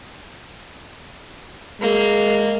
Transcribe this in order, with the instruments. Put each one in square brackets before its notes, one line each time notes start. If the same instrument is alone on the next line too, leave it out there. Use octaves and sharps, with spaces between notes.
[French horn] G#3 [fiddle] A#3